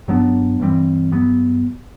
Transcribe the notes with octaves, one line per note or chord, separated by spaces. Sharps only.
G2 F#3 B3 D4
G2 E3 G3 C4
G2 F#3 B3